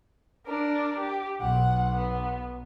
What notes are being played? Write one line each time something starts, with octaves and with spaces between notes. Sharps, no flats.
D4 A#4
G4
B1 F#5
B3